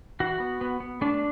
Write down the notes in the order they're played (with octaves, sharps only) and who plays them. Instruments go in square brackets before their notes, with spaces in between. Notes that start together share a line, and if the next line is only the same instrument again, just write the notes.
[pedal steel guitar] E3 F#4
B3
B3
B3
A3 D4